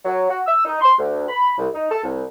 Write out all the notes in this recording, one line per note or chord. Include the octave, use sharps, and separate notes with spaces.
F#3
F#4
E6
D#4
C6
D2
B5
C2
D#4
A4
C2